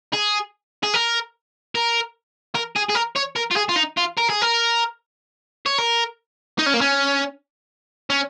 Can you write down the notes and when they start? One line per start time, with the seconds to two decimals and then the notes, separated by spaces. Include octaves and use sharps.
0.13 G#4
0.84 G#4
0.94 A#4
1.75 A#4
2.55 A#4
2.76 G#4
2.90 G#4
2.95 A#4
3.16 C#5
3.36 A#4
3.51 F4
3.57 G#4
3.69 F4
3.76 D#4
3.97 F4
4.17 A#4
4.29 G#4
4.41 A#4
5.66 C#5
5.78 A#4
6.59 D#4
6.66 C#4
6.74 A#3
6.81 C#4
8.10 C#4